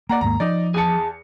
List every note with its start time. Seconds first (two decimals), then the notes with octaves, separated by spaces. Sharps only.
0.09 A#3 D5 F#5 A#5
0.21 D#2 G#2 A#3 A#5
0.40 F3 D#4 D5
0.74 E2 G#4 A5 C#7